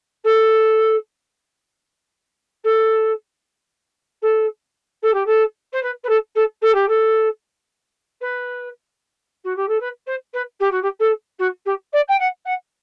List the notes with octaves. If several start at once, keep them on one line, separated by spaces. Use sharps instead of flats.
A4
A4
A4
A4
G4
A4
C5
B4
B4
A4
A4
A4
G4
A4
B4
F#4
G4
A4
B4
C5
B4
G4
F#4
G4
A4
F#4
G4
D5
G5
F#5
F#5